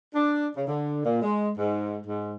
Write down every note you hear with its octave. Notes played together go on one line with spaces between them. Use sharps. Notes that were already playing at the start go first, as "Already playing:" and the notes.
D4
C#3
D3
A#2
G#3
G#2
G#2